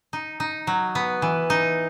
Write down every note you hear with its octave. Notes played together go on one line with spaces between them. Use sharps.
D#4
D#4
F#3
B3
E3
D#4